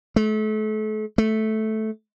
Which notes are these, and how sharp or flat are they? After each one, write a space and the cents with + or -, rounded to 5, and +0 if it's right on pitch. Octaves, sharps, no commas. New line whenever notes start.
A3 -35
A3 -10